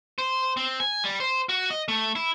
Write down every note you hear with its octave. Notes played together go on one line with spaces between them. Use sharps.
C5
C4
G#5
G3
C5
F#4
D#5
A3
E4